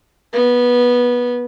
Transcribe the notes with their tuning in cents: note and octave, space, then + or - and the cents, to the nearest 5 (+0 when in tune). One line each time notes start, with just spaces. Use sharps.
B3 -15